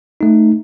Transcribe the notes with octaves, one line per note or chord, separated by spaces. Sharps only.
A3 D#4